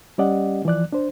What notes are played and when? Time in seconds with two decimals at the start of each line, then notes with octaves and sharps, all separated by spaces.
0.18 G3 C#4 G4 D5 D#5 F#5
0.65 E3 F3 D5 F#6
0.92 D4 C5